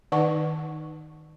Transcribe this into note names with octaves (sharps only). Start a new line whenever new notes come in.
D#3 D#4 B4 F#5 A5 C#6